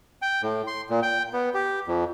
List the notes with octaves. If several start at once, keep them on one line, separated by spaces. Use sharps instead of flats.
G5
A2
C6
A#2
G5
B3
G4
F2